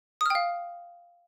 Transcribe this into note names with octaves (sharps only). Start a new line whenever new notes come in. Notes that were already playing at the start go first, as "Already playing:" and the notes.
F5 G5 D#6 F6